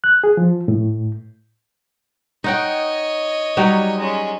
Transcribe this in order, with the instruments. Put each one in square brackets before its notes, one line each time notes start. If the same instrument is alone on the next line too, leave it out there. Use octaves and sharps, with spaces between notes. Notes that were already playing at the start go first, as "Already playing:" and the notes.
[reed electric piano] F#6
G#4
F3
A2
[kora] D#4 F#5 G5 [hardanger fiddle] C#5 D#5
[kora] F#3 G3 D#4
[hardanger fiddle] G#3 C#4